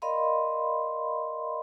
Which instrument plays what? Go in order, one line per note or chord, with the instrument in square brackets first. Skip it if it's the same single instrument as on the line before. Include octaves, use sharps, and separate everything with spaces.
[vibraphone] A#4 D5 D#5 F5 B5 C6